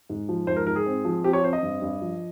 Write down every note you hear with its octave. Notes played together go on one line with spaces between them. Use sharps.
G#2
F3
G#2 C5
A#4
G#2 A#4
G#4
C4
F3
C4 G4
C#5
C4 C5
D#5
G2
G2
F3